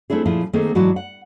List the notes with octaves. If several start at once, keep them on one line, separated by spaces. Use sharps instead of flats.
A3 C4 D4 E4 G#4
A#2 F3 C#4 E4 F4 G#4
D#3 A3 A#3 C4 G#4 A4
G#2 E3 F#3 F#4 D5 A5
F#5